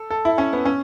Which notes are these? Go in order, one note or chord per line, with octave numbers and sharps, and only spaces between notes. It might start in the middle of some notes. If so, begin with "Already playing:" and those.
Already playing: A4
A4
E4
C#4
B3
C#4